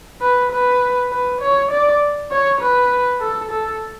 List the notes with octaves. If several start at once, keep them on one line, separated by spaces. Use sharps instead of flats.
B4
B4
B4
C#5
D5
C#5
B4
A4
A4